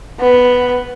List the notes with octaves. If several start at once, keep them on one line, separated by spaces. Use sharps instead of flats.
B3